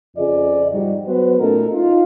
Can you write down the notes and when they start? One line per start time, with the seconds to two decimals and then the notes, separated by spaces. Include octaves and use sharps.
0.17 F2 C#3 F3 G#4 D5 D#5
0.71 G#2 F3 G3 D#4 F#4
1.06 F#3 G#3 B3 F#4 B4 C5
1.39 A#2 A3 C#4 D#4 A4 A#4
1.72 D#4 F4